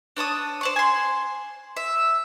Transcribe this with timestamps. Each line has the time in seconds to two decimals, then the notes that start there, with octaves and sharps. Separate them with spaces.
0.17 D4 C#5 A5 D#6
0.61 C5 D5 C#6
0.76 G#5 C6
1.77 E5